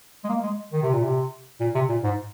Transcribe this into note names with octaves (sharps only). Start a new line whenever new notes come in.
G#3
A#3
G#3
D#3
C3
A#2
C3
A#2
C3
A#2
G#2